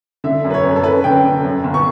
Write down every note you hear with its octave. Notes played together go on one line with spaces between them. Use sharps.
D3 E5
F#2
B4
C#5
F#2
A4
C#4 B4
D3 G5
D3
F#2
G1
C#6